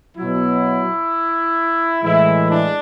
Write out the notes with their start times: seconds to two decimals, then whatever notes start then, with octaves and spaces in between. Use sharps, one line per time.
0.18 B2 F#3 E4
2.03 A2 E3 G#3 E4
2.49 D4